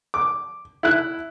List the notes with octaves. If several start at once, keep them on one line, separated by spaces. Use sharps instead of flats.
D6
E4 F#6